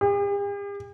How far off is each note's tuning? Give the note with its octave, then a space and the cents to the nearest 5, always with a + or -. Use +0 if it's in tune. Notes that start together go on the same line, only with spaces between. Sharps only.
G4 +45